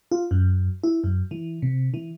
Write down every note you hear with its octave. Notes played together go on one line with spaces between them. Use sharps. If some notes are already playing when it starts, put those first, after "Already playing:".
F4
F#2
E4
F#2
E3
C3
E3